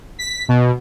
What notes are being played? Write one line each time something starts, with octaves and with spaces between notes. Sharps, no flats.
B6
B2